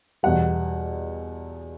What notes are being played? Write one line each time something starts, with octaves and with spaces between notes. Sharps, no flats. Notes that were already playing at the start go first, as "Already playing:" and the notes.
E2 B2 G3 F#5